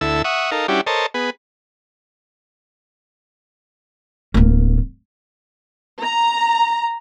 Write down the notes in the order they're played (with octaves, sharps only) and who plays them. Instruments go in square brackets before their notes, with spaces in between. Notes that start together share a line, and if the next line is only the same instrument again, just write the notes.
[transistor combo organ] D2 E4 A4 E6
E5 F#5 C#6 D#6
D#4 A4 A#4 F5
G3 C#4 D4 E4 F#4 G4
A4 A#4 C5 C#5 D#5 A5
B3 G#4 B4
[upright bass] D1 A#3
[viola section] A#5